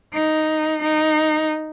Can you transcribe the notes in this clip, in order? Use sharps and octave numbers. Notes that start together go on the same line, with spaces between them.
D#4
D#4